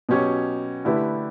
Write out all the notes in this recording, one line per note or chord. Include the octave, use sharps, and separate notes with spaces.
B2 F#3 C#4 G4 C#5
D3 A3 E4 G4 B4